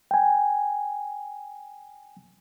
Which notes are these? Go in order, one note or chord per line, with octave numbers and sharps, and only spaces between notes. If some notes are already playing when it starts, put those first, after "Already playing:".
G5 G#5